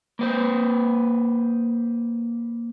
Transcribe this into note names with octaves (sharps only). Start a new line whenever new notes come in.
A#3 B4 C5